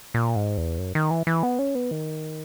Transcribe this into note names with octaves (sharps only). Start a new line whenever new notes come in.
A#2
G#2
E2
F#2
D#3
E3
E3
B3
C#4
B3
D#3